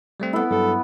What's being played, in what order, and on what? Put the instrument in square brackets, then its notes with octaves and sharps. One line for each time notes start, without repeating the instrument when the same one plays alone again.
[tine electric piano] G3 A3 C4
[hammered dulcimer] B3 E4 [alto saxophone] A4
[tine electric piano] G2 F#3 [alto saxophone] A4